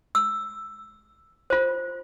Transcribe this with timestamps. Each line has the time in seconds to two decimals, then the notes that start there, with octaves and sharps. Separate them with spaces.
0.15 E6
1.50 F4 C5